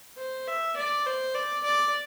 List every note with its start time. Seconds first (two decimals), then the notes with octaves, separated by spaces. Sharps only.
0.18 C5
0.47 E5
0.77 D5
1.06 C5
1.35 D5
1.64 D5